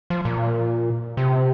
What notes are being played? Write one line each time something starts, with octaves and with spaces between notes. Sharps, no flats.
F3
A#2
C3